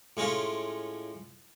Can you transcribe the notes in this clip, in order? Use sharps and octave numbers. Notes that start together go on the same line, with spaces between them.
A2 G#3 A3 C#4 F4